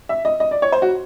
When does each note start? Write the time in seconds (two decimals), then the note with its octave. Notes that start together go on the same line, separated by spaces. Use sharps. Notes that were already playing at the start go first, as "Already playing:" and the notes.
0.09 E5
0.25 D#5
0.40 D#5
0.51 D5
0.62 C#5
0.72 C5
0.82 F#4